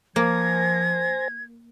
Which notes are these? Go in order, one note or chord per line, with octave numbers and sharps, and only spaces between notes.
F3 A#3 C5 G#5 G#6 A#6